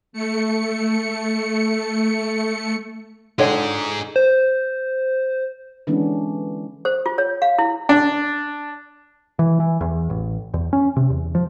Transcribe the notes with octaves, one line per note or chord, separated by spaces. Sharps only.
A3 C#7
D3 D4 D#4 F4 G#4 C#5 G5
C5
D3 E3 G#3 B3 C#4 D4
C5
F4
C#5
F5
E4
D4
E3
E3
E2
A1
E2
C#4
C3
E2
F3